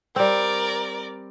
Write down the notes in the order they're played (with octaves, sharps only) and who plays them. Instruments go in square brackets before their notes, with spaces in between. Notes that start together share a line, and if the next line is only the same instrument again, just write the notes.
[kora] G3 C4 [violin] A#4 D5